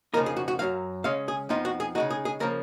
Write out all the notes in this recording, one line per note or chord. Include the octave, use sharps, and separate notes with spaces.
F2 C#3 F3 A#3 D#4 A#4
G#4
F#4
F#4
F#2 D#3 F#3 F5
C#3 G#3 C#4 F5
G#4
F2 F3 B3 D#4 F4
F#4
G#4
C#3 G#3 D#4 F#4
G#4
G#4
C#3 F3 A#3 A#4